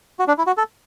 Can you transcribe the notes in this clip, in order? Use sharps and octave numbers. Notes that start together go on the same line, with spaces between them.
F#4
D4
E4
F#4
A4